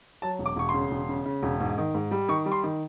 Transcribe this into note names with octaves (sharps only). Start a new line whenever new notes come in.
F#3 A5
E1
D6
E1 C#6
C#3 C6
E1
C#3
C#3
E1
G#2
D#3
G#2
G3
D#3 C#6
G3
C6
D#3